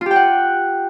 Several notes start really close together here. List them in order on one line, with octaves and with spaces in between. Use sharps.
F4 G4 G5 F#5